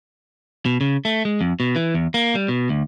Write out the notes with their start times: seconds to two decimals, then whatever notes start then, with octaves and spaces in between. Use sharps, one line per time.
0.66 B2
0.81 C#3
1.05 A3
1.25 G#3
1.41 F2
1.60 B2
1.76 E3
1.94 E2
2.14 A#3
2.35 G3
2.48 B2
2.69 D2